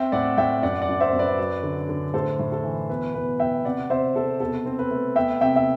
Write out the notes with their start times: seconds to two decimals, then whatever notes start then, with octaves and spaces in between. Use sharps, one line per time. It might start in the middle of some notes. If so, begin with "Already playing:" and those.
Already playing: C4 E5 G5
0.12 A2 D5 F#5
0.38 A2 E5 G5
0.63 F#2 D5 F#5
0.82 D5 F#5
0.88 F#2
1.00 C5 E5
1.13 F#2
1.19 B4 D5
1.38 F#3
1.63 D3
1.89 D3
2.14 A2 A4 C5
2.39 A2
2.52 A4
2.64 E3
2.89 B2 B4
3.14 B2 B4
3.40 B2 E5 G5
3.65 C3 D5 F#5
3.90 C3 C5 E5
4.15 C3 A4
4.40 B2 A4
4.66 C4
4.79 B4
4.91 A3
5.16 B3 E5 G5
5.41 C3 E5 G5
5.56 E5